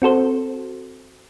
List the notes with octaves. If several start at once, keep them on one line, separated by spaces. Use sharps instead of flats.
C4 F#4 A4 C5